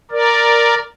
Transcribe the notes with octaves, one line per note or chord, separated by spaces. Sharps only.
A#4 D5